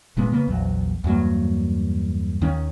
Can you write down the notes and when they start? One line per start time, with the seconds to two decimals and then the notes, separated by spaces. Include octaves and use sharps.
0.17 F1 A#2 G#3 B3
0.32 C#3 A#3 B3
0.47 A#1 E2 F#3
1.04 E2 G2 F#3 A#3
2.42 D#2 D#3 C#4